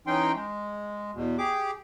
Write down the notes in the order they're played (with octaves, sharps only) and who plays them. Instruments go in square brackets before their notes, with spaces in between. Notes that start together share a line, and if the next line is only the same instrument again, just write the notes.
[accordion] E3 C#4 D#4 G5 C6
G#3
E2 B2
G4 G#4 D6